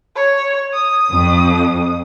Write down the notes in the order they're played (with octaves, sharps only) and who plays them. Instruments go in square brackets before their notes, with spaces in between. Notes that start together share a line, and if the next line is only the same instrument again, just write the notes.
[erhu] C#5
D#6
[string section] F2